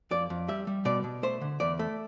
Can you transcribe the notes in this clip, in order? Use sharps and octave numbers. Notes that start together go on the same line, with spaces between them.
F2 D5
F2
G3 E5
G3
B2 D5
B2
A3 C5
D3
E2 D5
A3